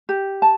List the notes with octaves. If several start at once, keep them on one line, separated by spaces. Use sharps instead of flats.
G4
A5